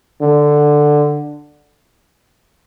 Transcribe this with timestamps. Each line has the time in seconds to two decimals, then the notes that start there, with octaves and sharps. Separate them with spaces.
0.22 D3